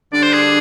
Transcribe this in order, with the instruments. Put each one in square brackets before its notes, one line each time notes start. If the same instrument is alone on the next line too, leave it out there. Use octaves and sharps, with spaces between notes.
[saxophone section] D3 G3 D4 [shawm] D5
[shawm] C5
G#4